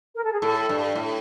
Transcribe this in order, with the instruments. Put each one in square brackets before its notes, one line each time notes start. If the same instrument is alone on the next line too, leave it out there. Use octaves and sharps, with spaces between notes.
[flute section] A#4
A4
G#4
[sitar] A2 [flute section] A4
[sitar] G2
A2